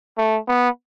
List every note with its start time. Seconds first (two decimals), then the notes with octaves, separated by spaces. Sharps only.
0.17 A3
0.48 B3